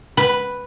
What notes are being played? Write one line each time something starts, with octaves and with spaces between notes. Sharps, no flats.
B4